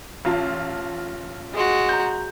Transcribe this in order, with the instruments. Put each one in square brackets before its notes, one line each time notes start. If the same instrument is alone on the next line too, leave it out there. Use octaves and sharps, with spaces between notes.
[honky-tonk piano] A1 F4 A5
[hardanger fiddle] G#3 F#4
[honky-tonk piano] A#5 G6